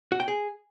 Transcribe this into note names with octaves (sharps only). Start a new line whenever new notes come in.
F#4
G5
G#4